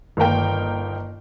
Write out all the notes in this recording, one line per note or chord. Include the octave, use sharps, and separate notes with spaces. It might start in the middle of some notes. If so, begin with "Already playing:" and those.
G1 D#3 A#3 A#4 G5